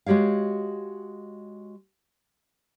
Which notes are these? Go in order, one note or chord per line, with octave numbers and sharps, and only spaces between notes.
G#3 F#4 G4 C#5 F5